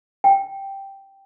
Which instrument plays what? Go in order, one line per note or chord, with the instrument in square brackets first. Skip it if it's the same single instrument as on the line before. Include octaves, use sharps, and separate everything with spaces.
[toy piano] G5